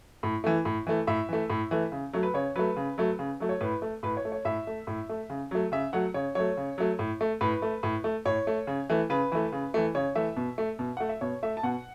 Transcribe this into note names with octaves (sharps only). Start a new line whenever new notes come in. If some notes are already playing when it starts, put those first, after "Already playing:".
A2
E3 A3
A2
E3 A3
A2 E5
E3 A3
A2
E3 A3
C#3
F#3 A3
B4
C#3 C#5
F#3 A3 B4
C#3
F#3 A3
C#3
F#3 A3
C#5
A2 B4
A3
A2 B4
C#5
A3
C#5
A2 E5
A3
A2
A3
C#3
F#3 A3
C#3 E5
F#3 A3 F#5
C#3 C#5
F#3 A3 C#5
C#3
F#3 A3
A2
A3
A2 B4
A3
A2
A3
A2 C#5
A3
C#3
E3 A3
C#3 B4
E3 A3
C#3
E3 A3
C#3 C#5
E3 A3 E5
B2
A3
B2
A3 F#5
E5
B2 C#5
A3 E5
A5
B2 F#5